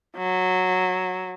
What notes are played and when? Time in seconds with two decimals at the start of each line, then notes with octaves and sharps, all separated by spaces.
0.17 F#3